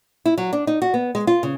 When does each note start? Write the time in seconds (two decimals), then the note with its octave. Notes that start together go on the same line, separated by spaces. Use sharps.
0.25 E4
0.38 F#3
0.53 D4
0.67 D#4
0.82 F#4
0.94 B3
1.15 G#3
1.27 F4
1.43 C#3